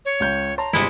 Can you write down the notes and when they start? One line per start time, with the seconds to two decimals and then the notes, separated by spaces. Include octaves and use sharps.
0.05 C#5
0.20 C#2 G6
0.58 C#5 A5 A#5 C6
0.73 G1 C3 G#3 E4